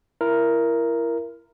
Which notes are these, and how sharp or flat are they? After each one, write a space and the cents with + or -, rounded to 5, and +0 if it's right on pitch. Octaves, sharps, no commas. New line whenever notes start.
E4 +30 A#4 +5